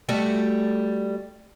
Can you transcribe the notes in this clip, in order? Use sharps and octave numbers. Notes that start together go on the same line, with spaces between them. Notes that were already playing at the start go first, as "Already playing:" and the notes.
G3 A3 F#4